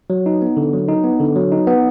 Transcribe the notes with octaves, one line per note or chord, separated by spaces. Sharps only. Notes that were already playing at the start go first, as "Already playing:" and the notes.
F#3
D#4
B3
D3
F#3
D#4
B3
D3
F#3
D#4
B3